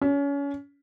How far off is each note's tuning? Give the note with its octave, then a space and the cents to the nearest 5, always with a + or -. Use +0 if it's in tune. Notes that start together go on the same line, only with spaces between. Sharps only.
C#4 +30